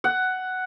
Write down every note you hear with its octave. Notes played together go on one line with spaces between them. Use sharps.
F#5